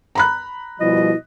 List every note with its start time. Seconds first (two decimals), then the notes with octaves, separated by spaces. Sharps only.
0.15 A#5 B5 F#6
0.80 B2 F3 G3 E4 D#5